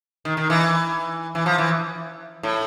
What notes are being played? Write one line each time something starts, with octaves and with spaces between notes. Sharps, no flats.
D#3
D#3
E3
E3
F3
E3
A2